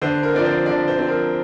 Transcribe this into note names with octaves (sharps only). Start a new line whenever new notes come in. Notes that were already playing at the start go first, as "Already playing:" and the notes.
D3 C5
A#4
F3 C4 D5
C5
D3 D5
C5
F3 C4
A#4